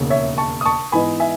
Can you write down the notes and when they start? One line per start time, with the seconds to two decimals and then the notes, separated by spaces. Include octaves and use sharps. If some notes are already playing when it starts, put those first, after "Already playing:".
Already playing: E1 D#2 C#3
0.10 C#5 E5
0.38 A5 C#6
0.61 D#6
0.65 A5 C#6
0.92 G#2 E3 B3 D#4 G#5 B5
1.20 E5 G#5